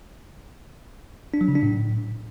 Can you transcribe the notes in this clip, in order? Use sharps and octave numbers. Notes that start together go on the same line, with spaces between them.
D4
F#3
C#3
D4
A2